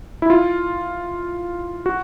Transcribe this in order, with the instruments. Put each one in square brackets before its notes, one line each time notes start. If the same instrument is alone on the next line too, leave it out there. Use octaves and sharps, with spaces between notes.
[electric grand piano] E4
F4
F#4